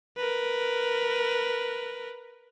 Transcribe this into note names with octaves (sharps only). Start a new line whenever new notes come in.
A#4 B4